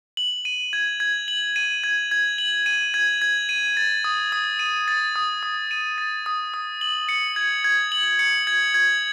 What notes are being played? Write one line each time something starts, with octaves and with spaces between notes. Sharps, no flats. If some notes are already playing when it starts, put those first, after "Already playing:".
F#7
D#7
G#6
G#6
F#7
D#7
G#6
G#6
F#7
D#7
G#6
G#6
D#7
A6
D#6
D#6
D#7
A6
D#6
D#6
D#7
A6
D#6
D#6
F#7
C#7
G#6
G#6
F#7
C#7
G#6
G#6